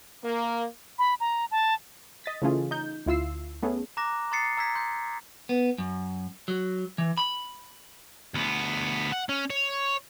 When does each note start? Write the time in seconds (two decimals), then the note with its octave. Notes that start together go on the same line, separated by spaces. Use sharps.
0.24 A#3
0.99 B5
1.20 A#5
1.51 A5
2.24 D#5 A6 B6
2.42 C#3 E3 A3 C#4 F4 G#4
2.71 D#4 G6
3.06 D2 E4 F4 E6 C7
3.62 A3 B3 C#4 G#4 A4
3.97 A#5 D6 F#6 A#6
4.31 A#5 C6 D#6 A6 C7 C#7
4.57 A#5 E6 G#6 B6
4.75 C6 G6
5.49 B3
5.78 F#2
6.48 F#3
6.98 E3
7.18 B5
8.34 D2 B3
9.12 F#5
9.29 C#4
9.50 C#5